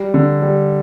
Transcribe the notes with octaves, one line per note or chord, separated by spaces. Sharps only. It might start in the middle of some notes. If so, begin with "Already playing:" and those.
Already playing: G3
D3
G3